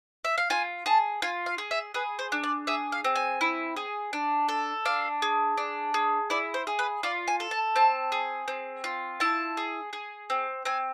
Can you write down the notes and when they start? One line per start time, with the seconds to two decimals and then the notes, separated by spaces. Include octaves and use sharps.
0.24 E5
0.38 F5
0.50 F4 G#5
0.86 G#4 A5
1.22 F4 G#5
1.46 F5
1.58 G#4
1.71 E5
1.94 G#4 B4
2.19 C5
2.32 D4
2.43 D5
2.67 G#4 E5
2.92 F5
3.04 C4
3.15 G#5
3.41 E4
3.77 G#4
4.13 D4
4.49 A4
4.85 D4 F5
5.22 G#4
5.58 D4
5.94 G#4
6.30 E4 D5
6.54 C5
6.67 G#4
6.79 B4
7.03 F4 D5
7.28 G#5
7.40 A4
7.51 A5
7.76 C4 A5
8.12 G#4
8.48 C4
8.84 F4
9.20 E4 A5
9.57 G#4
9.93 G#4
10.30 C4
10.65 C4 G#5